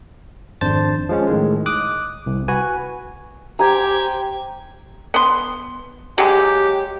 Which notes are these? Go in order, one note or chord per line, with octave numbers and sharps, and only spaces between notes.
G#1 F2 D4 C5 A5 A6
F3 G#3 C#4
A2 D#3 G#3
D6 D#6 F#6
C2
F#4 B4 G#5
G4 C5 G5 G#5 A#5 G#6
B3 C6
F#3 G#3 G4